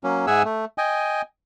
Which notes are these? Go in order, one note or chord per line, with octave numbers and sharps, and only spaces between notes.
F#3 A#3 C#4
G#2 G#4 E5 F#5 G#5 E6
A3
D#5 G5 G#5